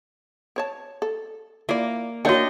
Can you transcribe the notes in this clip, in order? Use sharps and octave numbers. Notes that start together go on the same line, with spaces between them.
C4 C#5 A5
A4
A#3 E4 F4 D5
D#3 A#3 D4 E4 F#4 C#5 D#5 G5